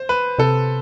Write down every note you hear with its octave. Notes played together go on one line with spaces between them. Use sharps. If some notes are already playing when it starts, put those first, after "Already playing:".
Already playing: C5
B4
C3 A4